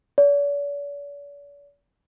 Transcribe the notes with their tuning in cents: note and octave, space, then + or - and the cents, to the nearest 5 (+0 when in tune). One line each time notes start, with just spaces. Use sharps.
D5 -45